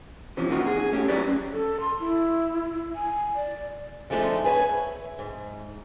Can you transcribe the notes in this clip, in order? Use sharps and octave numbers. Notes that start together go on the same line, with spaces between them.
C3 E3 F3 C#4
C3 A#3 D#4 F4 F#4
G#4
G#4
A3 C#4 G4
F#3 C#4 E4 G4 B4 D5
A4
C6
E4
G#5
D5
D3 F3 G#3 A3 D4 D#4
G#4 B4 C#5 G#5
E5
G#2